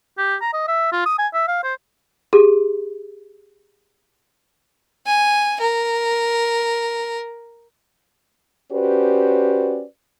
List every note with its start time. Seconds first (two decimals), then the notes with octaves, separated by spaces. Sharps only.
0.18 G4
0.41 A#5
0.54 D#5
0.68 E5
0.92 F4
1.06 D#6
1.19 G#5
1.34 E5
1.48 F5
1.64 C5
2.33 G4 G#4
5.06 G#5
5.61 A#4
8.72 C#4 F#4 G4 B4 C5 D5